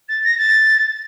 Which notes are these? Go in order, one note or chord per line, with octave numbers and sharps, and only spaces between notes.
A6
A#6
A6